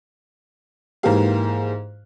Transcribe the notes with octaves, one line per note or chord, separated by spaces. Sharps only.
G#2 E3 A#3 E4 G4 F5